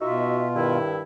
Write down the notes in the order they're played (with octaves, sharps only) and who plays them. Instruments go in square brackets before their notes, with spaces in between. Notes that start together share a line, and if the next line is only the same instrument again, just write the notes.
[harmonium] B2 F4 [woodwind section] D#4 F#4 E5
[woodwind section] G2 D#3 E4